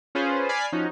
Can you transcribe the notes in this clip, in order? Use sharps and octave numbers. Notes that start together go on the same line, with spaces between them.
C#4 F4 G#4 B4 C5
D5 G#5 B5 F6 B6 C7
F3 C#4 D#4 F#4